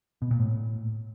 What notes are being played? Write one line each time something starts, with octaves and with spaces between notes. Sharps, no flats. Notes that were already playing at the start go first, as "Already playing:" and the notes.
B2
A#2
A2